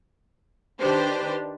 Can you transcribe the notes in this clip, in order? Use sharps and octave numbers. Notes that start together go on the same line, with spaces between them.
D#3 D4 G4 B4 C5